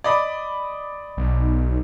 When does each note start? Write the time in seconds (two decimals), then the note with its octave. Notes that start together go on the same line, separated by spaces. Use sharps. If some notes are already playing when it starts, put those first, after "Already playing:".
0.04 D5 D#5 B5
1.17 B1